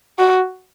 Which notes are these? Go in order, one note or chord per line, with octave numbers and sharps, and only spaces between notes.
F#4